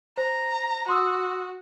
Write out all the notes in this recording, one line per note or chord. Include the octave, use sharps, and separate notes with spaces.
C5 A#5
F#4 C6 D#6 E6